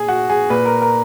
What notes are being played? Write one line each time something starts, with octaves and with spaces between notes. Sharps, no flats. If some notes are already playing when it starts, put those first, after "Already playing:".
Already playing: A#2 G#4
F#4
G#4
A#2 B4
A#4
A#4